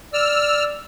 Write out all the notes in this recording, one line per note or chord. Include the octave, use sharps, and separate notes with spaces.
D5 E6 F6